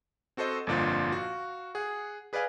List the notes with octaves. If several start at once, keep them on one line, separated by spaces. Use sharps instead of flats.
C4 F#4 A4 C5 D#5
G1 F2 A#2 D4 F4 C5
F#4 F5
G#4 F#5
G#4 B4 D5 D#5 F5 G#5